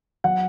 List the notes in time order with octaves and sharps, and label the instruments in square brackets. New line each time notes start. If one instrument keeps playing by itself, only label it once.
[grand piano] F#3 F#5